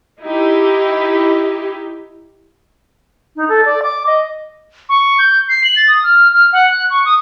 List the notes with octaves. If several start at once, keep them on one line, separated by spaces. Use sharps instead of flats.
D#4 E4 G4
D#4
A4
D5
D6
D#5
C#6
G6
C7
F#7
A6
D#6
F6
F6
F#5
F#6
C#6
D#6